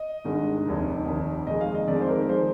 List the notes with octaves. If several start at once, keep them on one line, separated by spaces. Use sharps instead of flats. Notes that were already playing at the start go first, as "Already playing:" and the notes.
Already playing: D#5
G#1 G2 D#3 G#3
F1 D#2 D#3
F1 D#2 D#3
F2 D#3 G#3 D#5
F5
D#5
F2 D#3 G#3 D5
C5
A#4
F3 G#3 C5